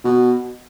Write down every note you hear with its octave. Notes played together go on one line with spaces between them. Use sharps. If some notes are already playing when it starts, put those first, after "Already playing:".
B2